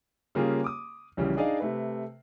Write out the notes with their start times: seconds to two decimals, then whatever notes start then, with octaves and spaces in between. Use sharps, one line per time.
0.35 C#3 G3 A#3 F4 G4 G#4
0.64 D6 D#6
1.17 A#1 C#3 E3 G3
1.37 D4 D#4 G#4 D5 D#5 F5
1.60 C3 A3 B4